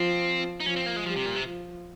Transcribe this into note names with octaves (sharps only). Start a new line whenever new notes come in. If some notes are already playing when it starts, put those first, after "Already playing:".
Already playing: F3 C4
D#4
F3 C#4
C4
A#3
G#3
F3 G3
C3
A#2
C3
F3